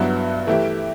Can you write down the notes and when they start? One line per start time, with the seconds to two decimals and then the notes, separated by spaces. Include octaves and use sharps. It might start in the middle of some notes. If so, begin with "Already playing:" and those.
Already playing: G2 F#3 B3 E4
0.47 E3 A3 E4 G4